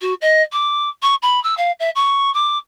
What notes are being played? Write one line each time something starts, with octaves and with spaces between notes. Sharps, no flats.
F#4
D#5
D6
C#6
B5
E6
F5
E5
C#6
D6